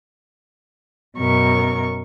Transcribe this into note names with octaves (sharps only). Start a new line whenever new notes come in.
F#2 B2 A#4 C#6